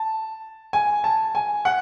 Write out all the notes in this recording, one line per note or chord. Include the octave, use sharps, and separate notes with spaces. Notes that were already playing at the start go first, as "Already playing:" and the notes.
Already playing: A5
G#5
A5
G#5
F#5